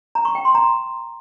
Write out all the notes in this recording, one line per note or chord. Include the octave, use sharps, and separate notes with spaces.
A#5
C#6
G5
C6
A#5